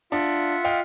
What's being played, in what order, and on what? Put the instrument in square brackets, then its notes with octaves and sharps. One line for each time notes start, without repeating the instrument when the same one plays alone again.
[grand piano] D4 [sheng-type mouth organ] F4 E5 F#5
[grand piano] D#5 F5 G5